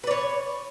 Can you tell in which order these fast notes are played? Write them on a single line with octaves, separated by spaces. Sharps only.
B4 D5 C#5